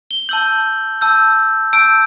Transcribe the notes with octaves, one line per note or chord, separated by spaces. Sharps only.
G7
A5 E6 G6 F#7
A5 E6 G6
A5 E6 G6 D7